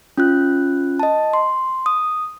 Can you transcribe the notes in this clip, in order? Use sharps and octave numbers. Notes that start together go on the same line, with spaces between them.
C#4 F4 F#6
D#5 A5
C6
D#6